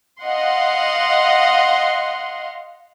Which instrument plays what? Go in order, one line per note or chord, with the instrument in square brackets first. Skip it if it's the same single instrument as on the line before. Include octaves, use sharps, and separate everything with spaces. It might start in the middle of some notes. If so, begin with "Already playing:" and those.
[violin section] D#5 F5 F#5 C6